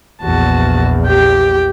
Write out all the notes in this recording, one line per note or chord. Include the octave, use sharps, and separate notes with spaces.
A#1 E2 F#4 A5
G4 G5